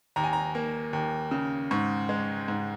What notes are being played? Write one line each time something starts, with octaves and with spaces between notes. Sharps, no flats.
D#2 A#5
G#5
A#5
A#3
D#2
C#3
G#2 C#6
G#3
G#2